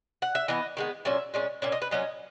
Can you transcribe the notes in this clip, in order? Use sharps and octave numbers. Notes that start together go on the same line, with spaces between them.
F#5
E5
E3 B3 D#5
D#3 G#3 B3
A#2 F#3 C#4 E5
A#2 G#3 C#4
A#2 A#3 C#4 E5
D#5
B4
A#2 F#3 C#4 D#5